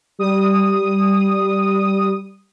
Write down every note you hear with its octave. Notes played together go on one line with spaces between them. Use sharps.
G3 D#6